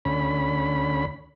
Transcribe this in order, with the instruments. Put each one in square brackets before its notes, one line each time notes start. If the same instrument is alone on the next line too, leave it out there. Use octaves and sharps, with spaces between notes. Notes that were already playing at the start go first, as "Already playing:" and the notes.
[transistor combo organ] D2 C#4 B5